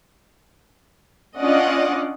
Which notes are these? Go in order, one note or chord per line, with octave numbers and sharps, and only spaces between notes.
C#4 D4 F4 D5 D#5 F#5